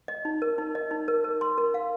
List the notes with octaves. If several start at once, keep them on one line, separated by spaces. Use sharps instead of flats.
D#5
D#4
A#4
D#4
D#5
D#4
A#4
A#4
C6
A#4
F5